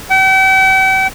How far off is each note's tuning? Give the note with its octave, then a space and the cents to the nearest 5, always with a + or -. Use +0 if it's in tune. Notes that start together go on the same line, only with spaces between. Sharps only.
G5 -45